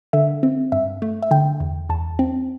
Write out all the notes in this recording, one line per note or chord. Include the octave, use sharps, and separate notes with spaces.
D3 E5
C4
G2 E5
A3
E5
D3 G5
E2
E2 A5
C4